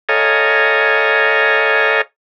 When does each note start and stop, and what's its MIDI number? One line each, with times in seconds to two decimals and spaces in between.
0.09 2.01 69
0.09 2.01 73
0.09 2.01 75
0.09 2.01 77
0.09 2.01 80
0.09 2.01 82